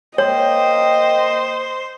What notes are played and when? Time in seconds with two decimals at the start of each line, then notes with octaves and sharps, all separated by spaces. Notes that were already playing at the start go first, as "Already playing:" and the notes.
0.18 A#3 C5 C#5 D#5 G5